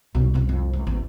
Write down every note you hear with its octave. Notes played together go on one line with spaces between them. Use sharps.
C2 B2 C#4
C#3 C4
F2
C#2
A1 E2